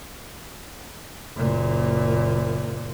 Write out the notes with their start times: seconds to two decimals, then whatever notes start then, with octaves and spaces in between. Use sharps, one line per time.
1.36 F#1 A#2